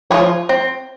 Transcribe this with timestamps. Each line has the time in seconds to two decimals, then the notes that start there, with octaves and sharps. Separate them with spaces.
0.10 F3 F4 G#4 C#5
0.49 C4